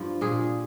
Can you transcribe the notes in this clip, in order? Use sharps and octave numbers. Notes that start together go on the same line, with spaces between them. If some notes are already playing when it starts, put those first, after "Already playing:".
Already playing: G2 F3
A#2 G3 G#4